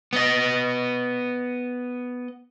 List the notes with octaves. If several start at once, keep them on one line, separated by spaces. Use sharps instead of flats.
B3 D#5